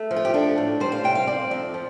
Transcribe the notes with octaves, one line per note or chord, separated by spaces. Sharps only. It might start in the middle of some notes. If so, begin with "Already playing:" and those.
Already playing: A3
F3
F4
G4
D4 A4
A2
G3 C5
F5
C3 G5
F5
C4 D5
F2
F3